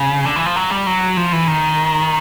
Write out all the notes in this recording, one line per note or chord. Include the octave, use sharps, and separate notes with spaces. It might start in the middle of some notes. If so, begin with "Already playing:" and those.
Already playing: C#3
D3
E3
F3
F#3
G3
F#3
F3
E3
D#3